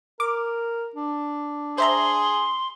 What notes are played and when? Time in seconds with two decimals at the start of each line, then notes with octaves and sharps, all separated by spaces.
0.20 A#4 D6
0.96 D4
1.78 G#4 C5 E5 A#5 C6